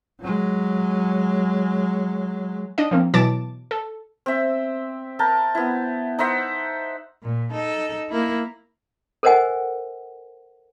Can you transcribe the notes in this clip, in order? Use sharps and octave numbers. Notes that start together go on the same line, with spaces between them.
F#3 G#3
D4 D#5
F3 A#3 C4
B2 E3 F#3 A5 D6 A6
A4
C4 E5
A#4 G5 A5
B3 E4
D#4 C5 E5 F#5
A#2
D#4 A4
A#3 E4
A4 A#4 C5 D#5 F#5 G#5